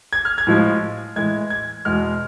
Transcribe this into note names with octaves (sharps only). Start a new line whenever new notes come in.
G#6
F6
G#6
A2 F3 G#3
A2 E3 G#3 G#6
G#6
E2 B2 G#3 F6